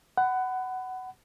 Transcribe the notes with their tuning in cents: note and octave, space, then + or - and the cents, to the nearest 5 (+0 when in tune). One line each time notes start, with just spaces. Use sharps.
F#5 +15 B5 +25